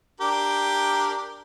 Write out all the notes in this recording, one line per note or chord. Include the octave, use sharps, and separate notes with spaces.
D4 G4 A#4